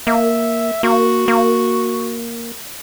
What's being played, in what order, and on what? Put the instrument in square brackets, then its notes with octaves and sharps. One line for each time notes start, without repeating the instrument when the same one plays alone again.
[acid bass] A#3 [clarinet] E5
[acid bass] A#3 [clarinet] F#4
[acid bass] A#3